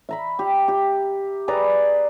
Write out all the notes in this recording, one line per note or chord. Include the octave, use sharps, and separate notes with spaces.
E5 A#5 B5
G4
G4
G#4 B4 D5 A#5